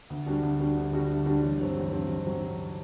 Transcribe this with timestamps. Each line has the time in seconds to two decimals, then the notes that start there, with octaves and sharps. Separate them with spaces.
0.10 D2
0.26 D3 G3 D4 F#4
0.43 D2
0.60 D3 G3 D4 F#4
0.77 D2
0.93 D3 G3 D4 F#4
1.10 D2
1.26 D3 G3 D4 F#4
1.43 A1
1.60 G2 F#3 C4
1.77 A1
1.93 G2 F#3 C4
2.09 A1
2.26 F#3 C4